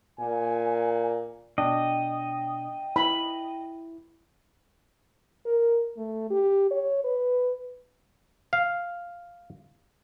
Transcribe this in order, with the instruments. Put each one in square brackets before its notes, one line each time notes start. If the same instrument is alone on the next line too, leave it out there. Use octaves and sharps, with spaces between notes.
[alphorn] A#2 [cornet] G#5
[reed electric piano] B2 D4 [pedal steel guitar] D#5 [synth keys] G5
[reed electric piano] E4 [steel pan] B5
[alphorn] A#4
A3
G4
C#5
B4
[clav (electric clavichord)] F5